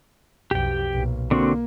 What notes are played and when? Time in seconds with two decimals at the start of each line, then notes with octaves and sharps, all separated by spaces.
0.51 B1 F2 G4 G5
0.94 B1 A#2
1.31 D3 A#3 C4 F#4